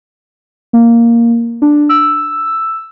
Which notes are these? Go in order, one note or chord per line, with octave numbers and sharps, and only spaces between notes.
A#3
D4
E6